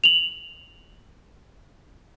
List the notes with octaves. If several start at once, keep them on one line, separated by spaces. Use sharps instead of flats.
F7 F#7